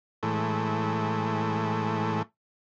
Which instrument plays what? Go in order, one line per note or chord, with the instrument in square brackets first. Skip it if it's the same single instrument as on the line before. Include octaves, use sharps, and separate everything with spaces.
[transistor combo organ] A2 E3 G#3 A3